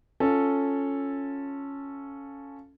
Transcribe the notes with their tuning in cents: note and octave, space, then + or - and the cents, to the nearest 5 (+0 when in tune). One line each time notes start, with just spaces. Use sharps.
C#4 +0 F4 +5 A4 +0